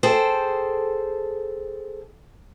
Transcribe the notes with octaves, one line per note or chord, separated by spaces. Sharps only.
G#4 A4 C5 G5 A5